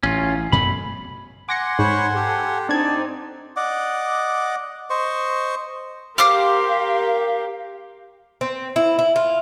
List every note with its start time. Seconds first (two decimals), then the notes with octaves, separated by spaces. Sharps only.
0.03 A1 C#4 F4
0.52 F#2 B2 A3 B5
1.49 F#5 G#5 C6 D6 A#6 C#7
1.79 G#2 C5 C#5 B5 C#6
2.15 G4 A4
2.69 C4 D4 D#4 D5 A5 G#6
3.56 D5 D#5 F#5 D6
4.90 C5 D#5 C#6
6.18 G4 A#4 C5 F5 D6 F6
8.41 C4
8.76 E4
8.99 E4
9.16 F4